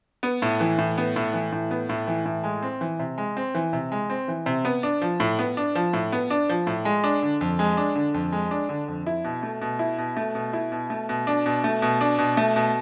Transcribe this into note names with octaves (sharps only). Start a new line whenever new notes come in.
B3
A2
E3
A2
B3
A2
E3
A2
B3
A2
E3
A2
G#3
C4
E3
C3
G#3
C4
E3
C3
G#3
C4
E3
C3
B3
D4
F3
A2
B3
D4
F3
A2
B3
D4
F3
A2
G#3
D4
D3
F2
G#3
D4
D3
F2
G#3
D4
D3
F2
E4
B2
A3
B2
E4
B2
A3
B2
E4
B2
A3
B2
D4
B2
A3
B2
D4
B2
A3
B2